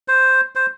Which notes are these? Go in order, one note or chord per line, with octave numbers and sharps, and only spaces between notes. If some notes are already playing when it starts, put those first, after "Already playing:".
C5
C5